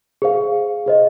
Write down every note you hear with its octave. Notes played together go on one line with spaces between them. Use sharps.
G#4 C5 F5
G#4 C5 D#5